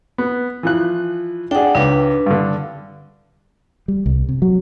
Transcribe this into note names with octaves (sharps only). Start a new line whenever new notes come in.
B3
E3 F3 F#6
D4 G#4 F#5 G5
C#2 G#2 D4 B4
G2 D3
G3
C2
C3
F#3